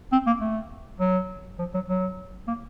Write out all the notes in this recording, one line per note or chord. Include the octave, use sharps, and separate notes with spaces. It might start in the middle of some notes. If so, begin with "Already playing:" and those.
C4
A#3
A3
F#3
F3
F#3
F#3
A#3